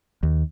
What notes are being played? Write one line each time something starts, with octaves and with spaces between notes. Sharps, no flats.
D#2